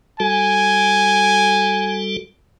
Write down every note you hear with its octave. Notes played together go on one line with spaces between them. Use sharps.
G3 F#4 A4 G#5